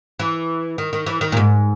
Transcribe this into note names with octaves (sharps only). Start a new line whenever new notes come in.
E3
D#3
D#3
E3
D#3
A#2
G#2